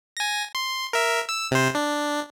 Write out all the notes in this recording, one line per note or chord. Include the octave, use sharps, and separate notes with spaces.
G#5 A#6
C6
A#4 E5
E6
C3 C5
D4